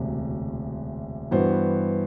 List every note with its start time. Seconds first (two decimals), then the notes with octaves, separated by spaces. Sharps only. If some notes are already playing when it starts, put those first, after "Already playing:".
Already playing: E1 D2 C3
1.31 G2 E3 B3 F#4 C5